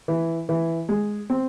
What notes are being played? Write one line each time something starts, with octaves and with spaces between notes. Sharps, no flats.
E3
E3
G#3
C4